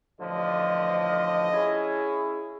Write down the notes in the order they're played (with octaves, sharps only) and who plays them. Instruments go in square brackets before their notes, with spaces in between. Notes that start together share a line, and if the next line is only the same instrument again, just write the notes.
[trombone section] A1 D3 F3 [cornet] D#5
[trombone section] C#4 E4 G#4